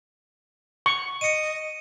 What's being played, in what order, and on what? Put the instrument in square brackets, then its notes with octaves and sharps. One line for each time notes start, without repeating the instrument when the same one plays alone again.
[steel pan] C#6
[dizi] D#5 [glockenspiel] C#7 D#7